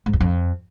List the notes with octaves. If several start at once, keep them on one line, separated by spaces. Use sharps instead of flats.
G#2
E2
F2